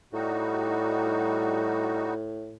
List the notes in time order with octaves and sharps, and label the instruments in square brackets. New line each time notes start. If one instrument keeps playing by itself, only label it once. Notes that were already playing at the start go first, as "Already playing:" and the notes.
[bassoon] A2 [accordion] G3 D#4 F#4